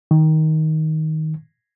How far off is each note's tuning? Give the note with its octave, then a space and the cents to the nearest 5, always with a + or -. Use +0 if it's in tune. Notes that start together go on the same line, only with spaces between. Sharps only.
D#3 +10